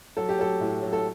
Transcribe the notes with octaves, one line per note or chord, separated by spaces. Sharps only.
F#3 A4
G4
F#3 A4
A2
F#3
A4